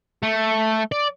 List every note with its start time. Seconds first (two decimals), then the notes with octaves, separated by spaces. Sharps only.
0.23 A3
0.92 D5